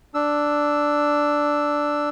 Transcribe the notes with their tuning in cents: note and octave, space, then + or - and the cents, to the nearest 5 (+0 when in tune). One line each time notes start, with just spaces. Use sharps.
D4 +0 E6 +0